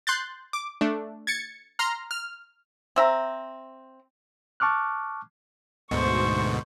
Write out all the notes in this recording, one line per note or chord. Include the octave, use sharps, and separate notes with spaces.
C6 F#6 G6 A6
D6
A3 D4
G#6 A6 C#7
A#5 C6 F6
F6
C4 E5 A#5
A5 C#6 D6 F6 F#6
D2 G#2 B2 C5 C#6